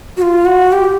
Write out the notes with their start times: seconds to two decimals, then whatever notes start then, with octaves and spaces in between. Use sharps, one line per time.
0.17 F#4
0.22 F4
0.45 F#4
0.73 G4